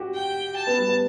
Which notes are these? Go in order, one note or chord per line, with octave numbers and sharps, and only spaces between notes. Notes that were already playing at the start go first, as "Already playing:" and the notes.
Already playing: F#4 G4
G5
A5
B3
G3
B3